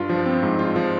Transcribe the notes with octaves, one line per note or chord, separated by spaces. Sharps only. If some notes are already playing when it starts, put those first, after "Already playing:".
Already playing: G2 F4
F3
C4
G#2
F4
F3